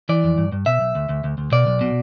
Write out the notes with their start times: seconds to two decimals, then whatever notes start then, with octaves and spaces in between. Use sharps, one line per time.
0.09 E3 D5
0.24 F2
0.38 G2
0.52 G2
0.66 B2 E5
0.81 B1
0.95 D2
1.09 D2
1.24 D2
1.38 D2
1.52 B2 D5
1.67 B1
1.81 B2